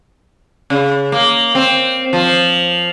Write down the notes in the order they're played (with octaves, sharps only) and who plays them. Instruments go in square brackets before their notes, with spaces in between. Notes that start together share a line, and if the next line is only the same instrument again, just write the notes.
[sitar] C#3
A#3
C4
F3